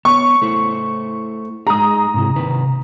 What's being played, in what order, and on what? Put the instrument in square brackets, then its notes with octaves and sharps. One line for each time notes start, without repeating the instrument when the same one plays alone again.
[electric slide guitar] B3 C#5 [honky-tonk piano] C#6
[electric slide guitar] A3 E4 C5
[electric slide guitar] G#3 D#4 G#4 [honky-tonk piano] A#5 D#6
[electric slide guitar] G#2 C3 E4
C3 D#3 B4